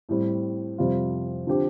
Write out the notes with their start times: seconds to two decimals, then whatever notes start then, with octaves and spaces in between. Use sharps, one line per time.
0.09 A2 G3 C4
0.78 F2 C3 G3 C4 F4
1.47 D3 F3 C4 G4